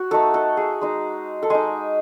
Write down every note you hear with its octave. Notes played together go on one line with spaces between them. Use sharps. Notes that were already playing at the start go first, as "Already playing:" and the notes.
Already playing: F#4
A3 D#4 A4
A4
G#4
G#3 D#4
A4
G#3 D#4 G#4